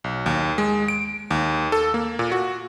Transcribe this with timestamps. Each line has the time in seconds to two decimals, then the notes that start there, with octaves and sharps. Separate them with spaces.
0.04 B1
0.26 D#2
0.58 G#3
0.88 D7
1.31 D#2
1.72 A4
1.94 A#3
2.19 A#2
2.32 F#4